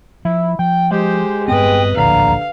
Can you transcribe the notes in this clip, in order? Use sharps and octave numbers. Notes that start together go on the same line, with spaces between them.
F3 E4
F3 G5
G#3 G4 C5
G2 B3 C4 B4 D#5 G5
D1 A#1 E2 D3 F5 A#5